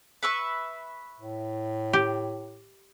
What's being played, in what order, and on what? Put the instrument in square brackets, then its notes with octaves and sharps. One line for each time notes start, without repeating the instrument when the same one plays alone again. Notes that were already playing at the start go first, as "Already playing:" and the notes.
[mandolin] B4 E5 C#6
[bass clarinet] A2
[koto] G4